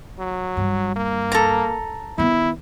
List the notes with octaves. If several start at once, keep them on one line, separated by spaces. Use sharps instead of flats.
F#3
G2
A#3
A4 A#5
D#3 B3 E4